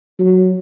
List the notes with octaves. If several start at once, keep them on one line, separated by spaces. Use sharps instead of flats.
F#3